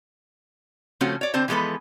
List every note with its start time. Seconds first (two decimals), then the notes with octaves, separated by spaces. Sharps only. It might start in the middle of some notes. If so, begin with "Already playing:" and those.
1.01 C#3 F3 A3 C4 C#4 F#4
1.21 C#5 D5
1.34 D3 C4 C5 A5
1.48 E3 F3 G#3 B3 A4 B4